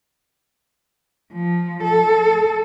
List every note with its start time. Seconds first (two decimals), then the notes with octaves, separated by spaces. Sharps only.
1.33 F3
1.84 A4